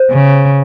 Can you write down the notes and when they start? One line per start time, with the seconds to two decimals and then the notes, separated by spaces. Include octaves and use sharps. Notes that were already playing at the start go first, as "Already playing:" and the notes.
Already playing: C5
0.11 C#3